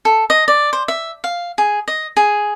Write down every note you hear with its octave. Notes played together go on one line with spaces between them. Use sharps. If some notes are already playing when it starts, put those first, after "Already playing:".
A4
D#5
D5
C5
E5
F5
G#4
D#5
G#4